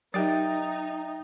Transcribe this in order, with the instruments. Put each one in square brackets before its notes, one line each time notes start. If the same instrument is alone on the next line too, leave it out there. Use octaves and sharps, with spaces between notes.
[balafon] F#3 G4 A#4 [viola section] D#4 [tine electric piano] E5 G5 A6